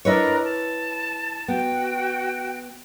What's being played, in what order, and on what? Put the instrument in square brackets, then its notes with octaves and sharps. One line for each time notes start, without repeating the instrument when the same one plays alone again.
[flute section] D4 A#4 D#5 [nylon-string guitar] E4 B4 C#5
[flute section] A5
[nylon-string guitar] B3 [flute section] F#4 G5